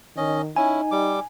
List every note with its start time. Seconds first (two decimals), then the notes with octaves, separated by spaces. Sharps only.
0.17 D#3 C#4 D#5
0.56 C#4 D#4 E4 G#5
0.91 G3 D6